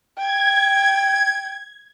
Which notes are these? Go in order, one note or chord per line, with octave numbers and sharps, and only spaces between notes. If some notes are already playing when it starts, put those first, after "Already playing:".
G5 G#6